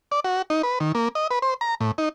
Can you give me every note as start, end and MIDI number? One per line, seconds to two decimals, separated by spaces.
0.12 0.20 74
0.24 0.42 66
0.50 0.62 63
0.63 0.79 71
0.80 0.92 51
0.95 1.08 58
1.15 1.27 75
1.31 1.39 71
1.42 1.54 72
1.61 1.75 82
1.81 1.91 45
1.98 2.09 63